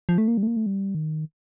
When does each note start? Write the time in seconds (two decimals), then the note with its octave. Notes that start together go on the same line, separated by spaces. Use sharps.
0.09 F3
0.18 A3
0.28 A#3
0.37 G3
0.43 A3
0.47 A#3
0.57 A3
0.66 G3
0.95 D#3